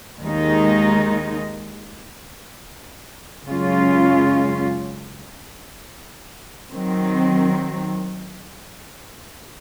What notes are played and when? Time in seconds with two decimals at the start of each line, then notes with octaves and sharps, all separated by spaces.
0.22 D#2 D#3 G#3 D#4
3.46 F#2 C#3 G#3 C#4 F4
6.70 D#3 F#3 C4